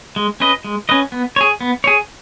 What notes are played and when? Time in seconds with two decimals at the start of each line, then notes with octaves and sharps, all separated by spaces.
0.16 G#3
0.40 C#4 B4 D#5
0.65 G#3
0.89 C#4 B4 D#5
1.12 B3
1.36 G#4 C#5
1.61 B3
1.84 G#4 C#5